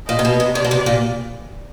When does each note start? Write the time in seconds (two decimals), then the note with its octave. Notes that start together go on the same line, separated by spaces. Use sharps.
0.09 A#2 D#5
0.19 C3
0.25 B2
0.40 C3
0.55 C3 D5
0.65 B2
0.71 C3
0.86 A#2